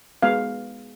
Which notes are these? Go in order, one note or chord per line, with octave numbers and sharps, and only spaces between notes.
G#3 B3 F#4 F5